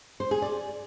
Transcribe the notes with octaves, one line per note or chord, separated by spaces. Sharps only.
C5
G#4
D5